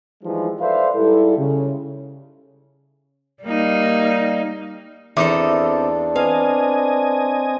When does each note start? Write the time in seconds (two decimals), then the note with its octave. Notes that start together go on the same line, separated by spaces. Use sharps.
0.24 E3 F3 G3 G#3 D#4
0.60 A4 B4 C5 D5 E5 F5
0.95 G#2 G3 E4 A4
1.38 C#3
3.44 G3 A#3 D#4
5.17 E2 C4 D4 D#4 A4 E5 D6
6.16 C4 B4 D#5 F5 G#5